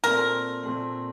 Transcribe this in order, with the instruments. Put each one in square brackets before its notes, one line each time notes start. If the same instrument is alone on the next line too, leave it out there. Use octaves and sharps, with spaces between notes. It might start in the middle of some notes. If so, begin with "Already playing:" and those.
[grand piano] A#2 A3 C4 [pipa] A#4
[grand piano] A#2 A3 C4